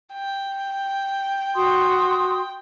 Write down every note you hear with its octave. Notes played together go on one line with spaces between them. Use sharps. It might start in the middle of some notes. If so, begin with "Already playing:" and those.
G5
F#4 C6 D#6